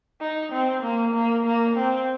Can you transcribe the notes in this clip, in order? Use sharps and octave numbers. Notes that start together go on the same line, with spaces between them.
D#4
C4
A#3
A#3
A#3
C4